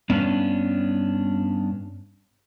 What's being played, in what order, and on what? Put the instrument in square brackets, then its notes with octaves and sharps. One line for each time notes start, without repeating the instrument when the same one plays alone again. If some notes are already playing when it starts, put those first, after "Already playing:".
[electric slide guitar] G2 B3 C#4 D4